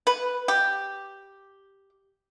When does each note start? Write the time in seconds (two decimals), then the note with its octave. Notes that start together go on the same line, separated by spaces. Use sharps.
0.07 B4
0.48 G4